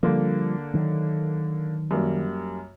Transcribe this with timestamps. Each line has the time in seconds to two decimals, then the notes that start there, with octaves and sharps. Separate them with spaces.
0.03 D3 F3 G3 A#3
0.74 D#3 F#3
1.91 F#2 G3 A#3